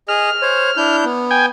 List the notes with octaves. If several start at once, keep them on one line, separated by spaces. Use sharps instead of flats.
G#4 D#5 F6
C5 C#5
D4 E4 G6
B3
G5 G#5